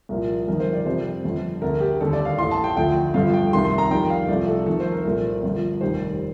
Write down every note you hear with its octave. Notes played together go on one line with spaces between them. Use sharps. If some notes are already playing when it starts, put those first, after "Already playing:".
C2 A#2 F3 A#4
G1 F2 D#3 A#4
C5
D5
F2 C3 G3 C5
G1 F2 D3
D2 D3 A3 A#4
G4
D#2 D3 G3 A4
D5
F5
A1 A2 A3 C6
A5
G5
D2 D3 F3 A3 G5
G1 G2 D3 F3 A3 F5
G5
C2 C3 D#3 A3 C6
C6
A#5
F2 D#3 G3 G5
F5
C2 C3 F3 A3 D5
A4
F2 D#3 A3 A4
C5
A#4
C2 A#2 A3
G1 G2 F3
F1 D#2 D#3 G3 C5